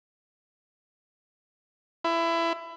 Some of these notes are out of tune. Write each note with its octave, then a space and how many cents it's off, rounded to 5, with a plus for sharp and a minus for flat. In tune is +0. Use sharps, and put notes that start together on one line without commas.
E4 +20